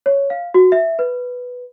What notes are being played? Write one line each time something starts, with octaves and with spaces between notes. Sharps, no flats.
C#5
F5
F#4
E5
B4